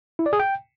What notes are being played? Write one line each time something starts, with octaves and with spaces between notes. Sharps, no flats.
E4
D5
G#4
G5